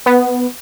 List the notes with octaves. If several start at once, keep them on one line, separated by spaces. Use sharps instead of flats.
B3